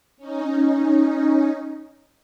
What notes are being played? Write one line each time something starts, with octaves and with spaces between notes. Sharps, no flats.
C#4 D#4